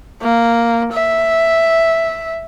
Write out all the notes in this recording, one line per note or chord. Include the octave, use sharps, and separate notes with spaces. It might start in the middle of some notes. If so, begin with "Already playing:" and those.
A#3
E5